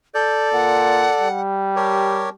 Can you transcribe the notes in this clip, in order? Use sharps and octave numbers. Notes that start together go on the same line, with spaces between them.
A4 D5 G6
A#2 F#5
G3
G4 A#4 C#5 A5